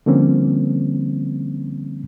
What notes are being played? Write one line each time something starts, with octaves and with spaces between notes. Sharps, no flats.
D3 F3 G3 A#3 C4 C#4